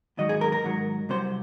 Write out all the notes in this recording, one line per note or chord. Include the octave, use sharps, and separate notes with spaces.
G#2 D#3 F#3 D#5
G#4
A#4
A#4
G#2 D#3 F#3
C2 C3 F#3 C5